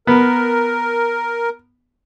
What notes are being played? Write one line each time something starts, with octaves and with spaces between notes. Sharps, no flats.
B3 A#4